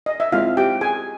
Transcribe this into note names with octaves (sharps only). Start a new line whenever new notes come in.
D#5
E5
G#3 C4 E4 F4 F5
G4 G5
G#4 G#5